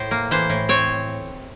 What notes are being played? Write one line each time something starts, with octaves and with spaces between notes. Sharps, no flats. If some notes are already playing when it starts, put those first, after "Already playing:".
Already playing: A2 C5
A#3
E3 C5
A2
C4 C#5